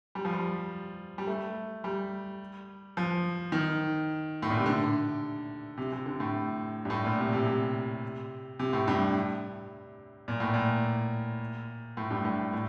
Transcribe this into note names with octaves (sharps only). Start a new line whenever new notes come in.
G3
F3
G3
G3
A3
G3
F3
D#3
A2
A#2
C3
D3
C3
C3
D3
A2
G2
A2
A#2
C3
C3
C3
C3
A2
G2
A#2
A2
A#2
A2
G2
A2
A2